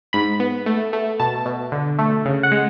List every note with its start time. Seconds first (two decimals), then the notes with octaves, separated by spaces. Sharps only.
0.13 G#2 B5
0.40 B3
0.66 A3
0.93 A3
1.20 B2 A5
1.46 B2
1.72 D3
1.99 A3
2.25 C#3
2.43 F#5
2.52 G#3